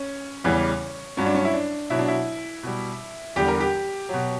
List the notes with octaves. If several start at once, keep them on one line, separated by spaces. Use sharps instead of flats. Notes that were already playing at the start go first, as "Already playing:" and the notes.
Already playing: C#4
E2 C#3 E3 G3
G2 F#3 C#4
D4
C#4
E4
D4
B2 F#3 E4
D4
E4
B2 G3
E2 D3 G3 G4
A#4
G4
B2 F#3